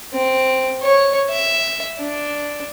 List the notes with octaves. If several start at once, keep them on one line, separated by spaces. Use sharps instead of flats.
C4
C#5
E5
D4